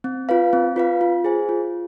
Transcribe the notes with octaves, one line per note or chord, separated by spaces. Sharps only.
C4
F4 B4 F5
C4
F4 B4 F5
F4
G#4 C5 G#5
F4